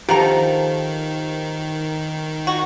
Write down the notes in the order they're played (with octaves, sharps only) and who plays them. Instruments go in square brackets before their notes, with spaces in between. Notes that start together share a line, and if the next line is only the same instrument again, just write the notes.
[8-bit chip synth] D#3 [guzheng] F3 [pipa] A#3 F#5 A#5 [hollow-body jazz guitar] G4 A4
[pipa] F#4